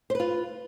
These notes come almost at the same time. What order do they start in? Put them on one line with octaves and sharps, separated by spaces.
C5 B4 F4